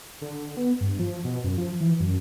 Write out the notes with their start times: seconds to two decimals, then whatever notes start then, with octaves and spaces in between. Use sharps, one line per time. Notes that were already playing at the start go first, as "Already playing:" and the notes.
0.22 D3
0.57 B3
0.81 G2
0.99 F3
1.24 B2
1.44 F#2
1.58 F3
1.81 E3
2.00 F#2